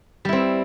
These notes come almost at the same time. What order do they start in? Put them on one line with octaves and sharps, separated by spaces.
G3 E4 C4